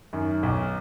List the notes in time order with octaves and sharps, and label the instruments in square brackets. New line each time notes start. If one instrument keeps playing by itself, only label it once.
[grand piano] F#2 D#3
B1